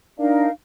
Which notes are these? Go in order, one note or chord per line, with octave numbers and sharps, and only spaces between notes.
D4 D#4 A#4 F5